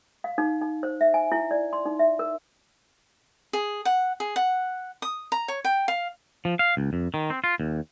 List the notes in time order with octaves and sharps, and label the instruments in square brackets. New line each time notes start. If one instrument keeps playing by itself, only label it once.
[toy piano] F5
D#4
D#4
C5
E5
G#5
E4
D5
C6
D#4
E5
A#4
[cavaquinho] G#4
F#5
G#4
F#5
D#6
A#5
C#5
G5
F5
[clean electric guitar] F3
F5
C#2
F2
D#3
C4
F4
D#2